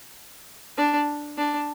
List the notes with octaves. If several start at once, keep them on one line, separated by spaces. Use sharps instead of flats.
D4
D4